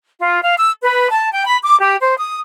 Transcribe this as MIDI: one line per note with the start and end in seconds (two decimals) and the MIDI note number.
0.19 0.41 65
0.43 0.55 77
0.57 0.73 88
0.82 1.09 71
1.10 1.31 81
1.32 1.44 79
1.47 1.58 83
1.64 1.76 86
1.81 1.96 67
2.01 2.17 72
2.17 2.39 87